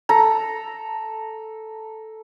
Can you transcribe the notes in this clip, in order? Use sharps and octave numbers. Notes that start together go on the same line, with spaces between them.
A4 A#5